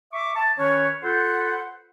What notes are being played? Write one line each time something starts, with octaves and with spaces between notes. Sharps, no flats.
E5 C#6 D6
A5
D#3 C#4 B4 C#5
F4 A4 B4 C5 F#5